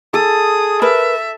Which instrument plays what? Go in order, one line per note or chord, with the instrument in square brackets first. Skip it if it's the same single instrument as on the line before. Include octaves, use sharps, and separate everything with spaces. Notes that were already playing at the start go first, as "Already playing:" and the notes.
[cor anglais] G#4 [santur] A4 [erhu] D#6
[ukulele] A#4 B4 [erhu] E5